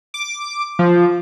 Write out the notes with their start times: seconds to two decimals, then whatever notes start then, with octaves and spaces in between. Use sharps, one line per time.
0.14 D6
0.79 F3